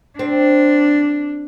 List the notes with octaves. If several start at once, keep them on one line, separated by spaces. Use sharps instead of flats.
C4 D4